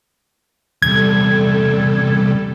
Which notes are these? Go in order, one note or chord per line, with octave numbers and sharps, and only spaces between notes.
E2 C3 G3 A4 G#6